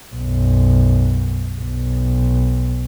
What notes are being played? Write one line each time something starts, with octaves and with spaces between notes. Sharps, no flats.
B1 F#2
B1